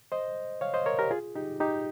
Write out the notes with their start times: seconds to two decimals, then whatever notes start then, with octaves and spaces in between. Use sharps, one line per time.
0.12 C5 D#5
0.61 C#5 F5
0.74 C5 D#5
0.86 A#4 C#5
0.99 G4 A#4
1.11 F4 G#4
1.35 D#4 G4
1.60 D#4 G4